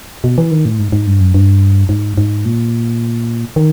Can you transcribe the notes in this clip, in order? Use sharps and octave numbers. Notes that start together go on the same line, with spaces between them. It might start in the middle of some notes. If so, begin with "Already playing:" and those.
B2
E3
D#3
A2
G#2
G#2
G2
F#2
G2
G#2
G#2
A#2
D#3